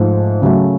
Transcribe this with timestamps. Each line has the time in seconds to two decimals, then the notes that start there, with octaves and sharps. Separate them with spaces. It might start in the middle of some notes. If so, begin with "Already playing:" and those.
Already playing: G#2 F3 A3
0.42 C#3 F#3 A3